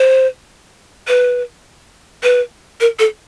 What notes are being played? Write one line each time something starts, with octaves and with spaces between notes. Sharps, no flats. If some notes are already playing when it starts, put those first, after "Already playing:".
Already playing: C5
B4
B4
A#4
A4